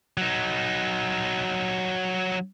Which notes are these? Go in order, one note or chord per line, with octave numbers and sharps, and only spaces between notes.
F#3 D#4